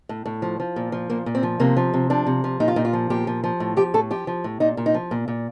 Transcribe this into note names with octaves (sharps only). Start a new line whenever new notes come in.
A2
A2
F3
F3
A#2
F3
A#2 A#3
A#2
C4
F3
C3 A#3
F3
C3
F3 D4
C3
F3
A#2 D#4
F4
A#2 D#4
F4
F3
A#2 G4
F3
F3
A2
F3 G4
A2 A4
F3 G4
F3
A2
A#2 D#4
A#2
D#4
F3
A#2
A#2